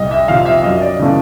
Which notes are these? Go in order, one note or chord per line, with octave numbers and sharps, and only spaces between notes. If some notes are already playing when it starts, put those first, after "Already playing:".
Already playing: C2 D#5
E5
C3 F3 F5
E5
F#2 D#5
D5
C#3 E3 A3